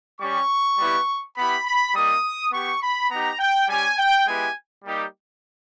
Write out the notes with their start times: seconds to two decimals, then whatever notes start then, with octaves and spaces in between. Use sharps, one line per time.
0.20 G3 C#4 G4 C#6
0.78 G3 B3 E4 G4
1.36 B3 E4 G4 B5
1.66 B5
1.94 G3 A#3 D#4 D#6
2.52 B3 G4 C#6
2.81 B5
3.10 B3 D#4 G4 A#5
3.40 G5
3.68 G3 C#4 G4 G#5
3.98 G5
4.27 G#3 B3 E4 G4 G#5
4.85 G3 A#3 D#4 G4